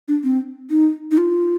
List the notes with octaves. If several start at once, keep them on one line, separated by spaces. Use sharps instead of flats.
D4
C4
D#4
D#4
F4